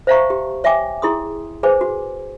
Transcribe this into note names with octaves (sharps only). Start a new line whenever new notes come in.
C5 E5 F5 A5 A#5 C#6
G4
C#5 E5 G5 G#5 D6
E4 G#4 C6 D#6
G#4 B4 C5 G#5 D6
F#4